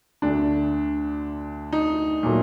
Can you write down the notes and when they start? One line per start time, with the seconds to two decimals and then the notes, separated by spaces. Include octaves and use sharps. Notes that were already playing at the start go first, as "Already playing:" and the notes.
0.22 D2 D3 A3 D4
1.73 D#4
2.23 A#2 F#3 A3